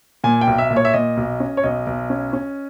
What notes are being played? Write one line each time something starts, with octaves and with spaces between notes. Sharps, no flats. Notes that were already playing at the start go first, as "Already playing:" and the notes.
A#2 G#5
G5
B1
E5
A#2
C#5
E5
A#2 D#5
B1
C#4
C#5
B1 D#5
B1
C#4
C#4